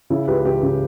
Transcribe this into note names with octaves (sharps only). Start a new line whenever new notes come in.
C#3 E4
C#2 G4 B4
C#2 G4 B4
C#3